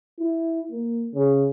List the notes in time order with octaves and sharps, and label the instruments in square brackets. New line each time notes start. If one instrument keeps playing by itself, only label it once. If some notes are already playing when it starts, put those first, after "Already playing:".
[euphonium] E4
A#3
C#3